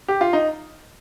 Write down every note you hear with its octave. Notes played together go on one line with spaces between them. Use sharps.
G4
F4
D#4